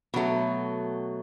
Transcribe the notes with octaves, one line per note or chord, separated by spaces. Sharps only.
B2 F#3 A3